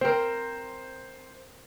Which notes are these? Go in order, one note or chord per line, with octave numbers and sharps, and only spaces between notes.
C4 A#4 C5